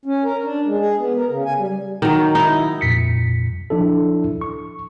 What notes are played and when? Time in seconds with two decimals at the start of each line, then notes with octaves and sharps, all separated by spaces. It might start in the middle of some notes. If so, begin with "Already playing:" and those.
0.05 C#4
0.24 A#4
0.44 D4
0.65 G#3
0.80 G#4
0.99 B3
1.17 A#4
1.30 C#3
1.45 G#5
1.58 G3
2.02 D#3 F#3
2.35 D#4 E4
2.81 F2 A#2 B6 C#7
3.70 F3 D4 E4 A4
4.41 C#6